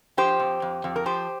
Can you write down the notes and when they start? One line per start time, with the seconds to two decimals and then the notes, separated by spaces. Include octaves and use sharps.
0.17 F3 G4 C5
0.40 F2
0.62 F2
0.84 F2
0.96 A#4
1.06 F3 G4 C5